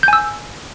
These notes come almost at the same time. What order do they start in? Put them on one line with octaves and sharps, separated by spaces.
G6 G#5 E6